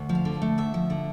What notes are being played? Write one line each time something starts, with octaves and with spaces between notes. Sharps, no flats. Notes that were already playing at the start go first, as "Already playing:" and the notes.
Already playing: D2
F3
F5
D3
A3
D2 E5
F3
D3